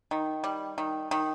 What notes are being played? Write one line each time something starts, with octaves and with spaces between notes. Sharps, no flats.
D#3
G3
D#3
D#3